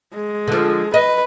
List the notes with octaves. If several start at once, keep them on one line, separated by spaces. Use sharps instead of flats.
G#3
D3 F3
B4 D#5